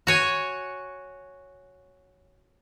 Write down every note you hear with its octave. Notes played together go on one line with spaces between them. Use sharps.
F#4 C#5 G#5